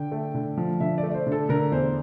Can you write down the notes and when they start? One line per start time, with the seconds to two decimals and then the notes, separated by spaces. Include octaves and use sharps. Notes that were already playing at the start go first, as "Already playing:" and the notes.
Already playing: D3 G5
0.12 A3
0.34 D3
0.57 F3
0.80 D3 E5
0.98 D5
1.03 A3
1.10 D5
1.14 C5
1.27 D3
1.32 A4
1.49 D3 A#4
1.72 E2 C5